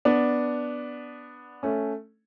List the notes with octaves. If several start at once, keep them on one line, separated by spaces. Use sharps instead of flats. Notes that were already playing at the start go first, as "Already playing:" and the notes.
B3 D4
A3 C#4